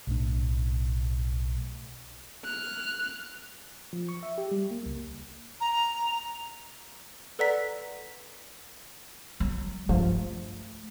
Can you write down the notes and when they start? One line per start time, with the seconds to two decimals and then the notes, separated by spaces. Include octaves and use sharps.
0.07 B1 A2 D4
2.45 F6 F#6
3.93 F3
4.09 C#6
4.23 E5
4.38 G4
4.52 G3
4.71 A#3
4.86 C#2
5.60 A#5
7.39 A4 B4 D5 F#5 A#5 B6
9.40 F#3
9.89 G2 F3 A3